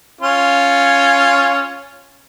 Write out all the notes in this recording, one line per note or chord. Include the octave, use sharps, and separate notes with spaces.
C#4 F4